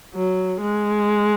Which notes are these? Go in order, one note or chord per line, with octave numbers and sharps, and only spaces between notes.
F#3
G#3